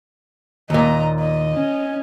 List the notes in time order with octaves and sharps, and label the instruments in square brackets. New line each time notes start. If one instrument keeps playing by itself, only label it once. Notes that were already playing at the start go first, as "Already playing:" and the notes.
[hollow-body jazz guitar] D#2 A#2 [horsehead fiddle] D#5 A#5
[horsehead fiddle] D#5
[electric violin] C#4